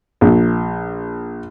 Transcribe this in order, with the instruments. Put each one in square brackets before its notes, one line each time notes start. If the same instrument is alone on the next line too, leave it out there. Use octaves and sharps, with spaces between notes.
[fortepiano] A#1